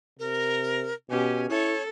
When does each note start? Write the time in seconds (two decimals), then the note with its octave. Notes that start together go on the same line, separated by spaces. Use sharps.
0.19 C3 A#4
1.10 B2 C#4 G4 G#5
1.50 E4 A4 C#5